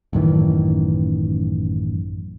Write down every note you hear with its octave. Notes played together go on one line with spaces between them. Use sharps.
A1 F#2 D#3 E3